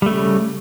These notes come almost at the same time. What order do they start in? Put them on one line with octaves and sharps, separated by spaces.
G3 A3 C#3